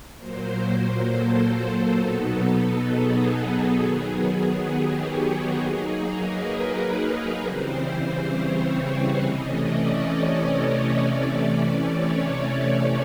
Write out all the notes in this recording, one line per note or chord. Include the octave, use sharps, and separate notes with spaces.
A#2 F#3 A#3 C5
A4
B2 F#3 B3 D#4
G#4
D#3 F#3 B3
G4
F#4
G4
F#3 A#3 D#4 G#4
A#4
B4
A#4
C#3 E3 G3 C4 C5
C#5
C5
B4
C3 E3 A3 C#4 D#5
D5
C#5
D5
C3 E3 A3 C#4
C#5